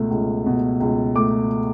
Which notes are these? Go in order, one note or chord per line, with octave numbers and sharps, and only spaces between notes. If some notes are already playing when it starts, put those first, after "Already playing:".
Already playing: C#2 B2 A3
C#2
B2
C#2
A3 D6